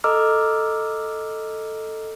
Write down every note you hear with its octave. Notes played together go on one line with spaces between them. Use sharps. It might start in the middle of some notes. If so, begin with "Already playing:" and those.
A4 D#5 A#5 D6 E6 F6